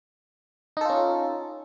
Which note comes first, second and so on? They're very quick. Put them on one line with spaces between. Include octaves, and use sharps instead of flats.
D#4 A4 F4 C#4